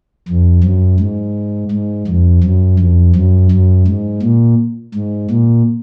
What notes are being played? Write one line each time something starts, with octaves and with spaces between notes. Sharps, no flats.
F2
F#2
G#2
G#2
F2
F#2
F2
F#2
F#2
G#2
A#2
G#2
A#2